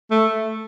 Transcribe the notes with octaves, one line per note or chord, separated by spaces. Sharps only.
A3